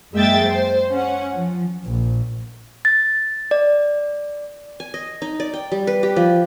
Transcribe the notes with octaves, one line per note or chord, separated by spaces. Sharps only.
F#2 G#3 A#3 E5 G5 A6
C5
C#4 F#5
F3
A#1
A6
D5
G#5
D#5
D#4
D5
G5
G3
B4
G4
F3